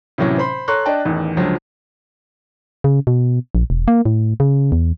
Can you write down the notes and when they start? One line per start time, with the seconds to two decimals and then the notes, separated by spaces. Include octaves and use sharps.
0.18 A2 C3 E3 F#3 C#4
0.38 C5 B5 C6
0.68 A4 C#5 A#5 C6 C#6 F#6
0.86 D4 D5 D#5 G5 A5
1.05 A1 E2 D#3
1.37 C#2 D3 F3 F#3
2.84 C#3
3.07 B2
3.55 A#1
3.70 E1
3.88 A#3
4.05 A2
4.40 C#3
4.72 E2